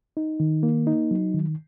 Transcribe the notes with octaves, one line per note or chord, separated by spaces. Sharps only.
D#4
D#3
A#3
D#4
F#3
D#3